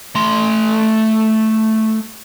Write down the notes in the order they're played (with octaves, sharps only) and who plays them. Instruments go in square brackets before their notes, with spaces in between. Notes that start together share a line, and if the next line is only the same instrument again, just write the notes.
[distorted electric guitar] A3 C6